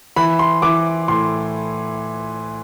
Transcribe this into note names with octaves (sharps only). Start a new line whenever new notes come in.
E3 B5
C6
E3 D6
A2 C6